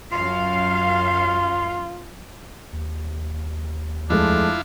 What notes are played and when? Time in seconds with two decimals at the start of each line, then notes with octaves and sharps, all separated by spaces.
0.12 F#2 F4 F5
2.73 D#2
4.10 F2 G#3 A3 D4 E4 F4